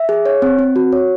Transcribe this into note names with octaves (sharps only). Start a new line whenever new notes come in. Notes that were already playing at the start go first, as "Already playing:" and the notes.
Already playing: E5
G#4
C#5
C4
C4
F#4
C#5